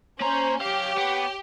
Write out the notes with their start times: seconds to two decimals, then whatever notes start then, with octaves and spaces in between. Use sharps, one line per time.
0.21 A#3 C#4 C5 A#5
0.61 F#2 G4 C#5 F5 G5
0.97 B3